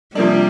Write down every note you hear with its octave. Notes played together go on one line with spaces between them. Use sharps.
C3 F3 G3 A#3 D4